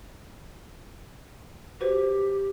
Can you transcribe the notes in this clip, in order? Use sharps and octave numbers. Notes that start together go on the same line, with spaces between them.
F#4 G4 B4 C5